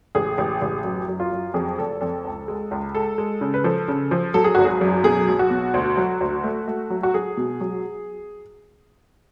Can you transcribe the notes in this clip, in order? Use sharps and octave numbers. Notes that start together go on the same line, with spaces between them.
A1 G#4
A1
A1
F#2
F#2
F4
F#2
F2 G#4
F1 A4
F2 A4
C#2
G#3
C#2
G#3 A4
G#3
C#3
B4
F3 A4
C#3
F3
F#3 A4
G#4
G#1 F#4
G#4
F#2
B2 G#4
B1
F#4
B2
D2
F#3
D2
A3
A3
F#3
F#4
F#3 G#4
B2
F#3